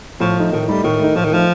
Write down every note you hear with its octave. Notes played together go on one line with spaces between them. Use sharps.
A2 F3
A3 D#4
A2 D#3
G3 A3 D#4
A2 D#3
A3 D#4
A2 F3
D#3
F3 A3 D#4